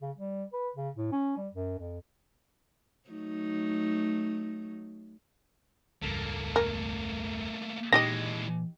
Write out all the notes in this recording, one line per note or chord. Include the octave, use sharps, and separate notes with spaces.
C#3
G3
B4
C#3
A2
C#4
G3
F#2
F2
F#3 A3 D#4
E1 C#2 G2 A3 A#3
A#4
A#2 E3 G#3 D#4 G4 D#5 A#6